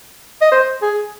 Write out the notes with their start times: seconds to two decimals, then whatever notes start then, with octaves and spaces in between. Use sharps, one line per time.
0.41 D#5
0.52 C5
0.82 G#4